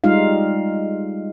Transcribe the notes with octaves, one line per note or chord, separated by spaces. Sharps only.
G3 G#3 D#4 F4 F5